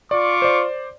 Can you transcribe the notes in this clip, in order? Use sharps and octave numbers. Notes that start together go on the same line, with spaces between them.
F4 D5 C#6 D6
C5 D5